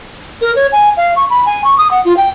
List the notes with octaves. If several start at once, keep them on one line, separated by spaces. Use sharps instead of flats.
A#4
C#5
G#5
F5
C#6
B5
G#5
C#6
D#6
F#5
F4
G5